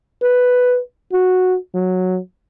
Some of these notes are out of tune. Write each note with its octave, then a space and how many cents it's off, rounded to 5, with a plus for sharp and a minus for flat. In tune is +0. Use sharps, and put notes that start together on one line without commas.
B4 +5
F#4 -10
F#3 -5